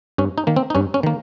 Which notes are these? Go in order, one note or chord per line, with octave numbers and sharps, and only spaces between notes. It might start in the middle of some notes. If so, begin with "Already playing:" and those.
G2 C#4
D#4
D#3 A#3
C4
D#4
G2 C#4
C#4
D#3 A#3